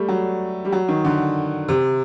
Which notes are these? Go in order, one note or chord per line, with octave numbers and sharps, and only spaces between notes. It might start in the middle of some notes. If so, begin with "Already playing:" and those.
Already playing: G3 A3
F#3
G3
F#3
D#3
D3
C3